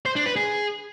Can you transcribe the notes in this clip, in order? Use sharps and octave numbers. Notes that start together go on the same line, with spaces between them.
C5
D4
B4
G#4